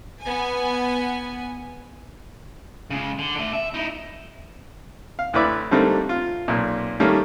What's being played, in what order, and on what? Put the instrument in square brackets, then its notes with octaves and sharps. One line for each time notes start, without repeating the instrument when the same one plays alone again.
[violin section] B3 G#5
[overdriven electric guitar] C#3 G#3
D3
D3 A3
E5
D#4 E4
[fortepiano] F5
D2 E4 B4 D5 E5
D3 G3 A3 A#3 C4 D#4
F4
B1 A#2
D#3 G3 A3 A#3 C#4